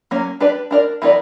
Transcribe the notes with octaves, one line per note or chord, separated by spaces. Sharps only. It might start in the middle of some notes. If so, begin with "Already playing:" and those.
F#3 A#3 C#4
D4 G4 B4 D5
D4 A#4 D5
E3 B3 E4 A#4 D5